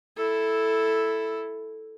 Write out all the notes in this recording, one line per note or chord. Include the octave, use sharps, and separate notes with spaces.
E4 A4